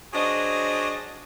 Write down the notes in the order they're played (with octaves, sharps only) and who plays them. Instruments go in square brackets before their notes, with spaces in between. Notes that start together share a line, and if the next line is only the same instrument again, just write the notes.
[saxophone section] F#3 D4 G#4 C5 D#5